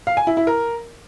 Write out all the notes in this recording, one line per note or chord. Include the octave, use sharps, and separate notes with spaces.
F5
G#5
E4
E4
A#4